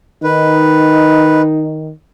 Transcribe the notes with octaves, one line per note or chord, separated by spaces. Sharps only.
D#3 D#4 B4